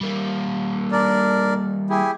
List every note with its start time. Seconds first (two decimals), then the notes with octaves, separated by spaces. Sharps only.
0.01 G3 A#3
0.92 D4 A#4 D5
1.90 E4 G4 G#4